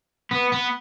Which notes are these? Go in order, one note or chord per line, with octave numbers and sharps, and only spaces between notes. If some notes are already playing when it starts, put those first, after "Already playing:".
B3
B3